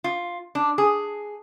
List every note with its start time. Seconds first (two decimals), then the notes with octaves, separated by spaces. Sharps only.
0.04 F4
0.55 D4
0.78 G#4